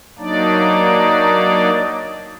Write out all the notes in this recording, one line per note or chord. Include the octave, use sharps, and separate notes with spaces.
F#3 A#3 D4 D#4 D5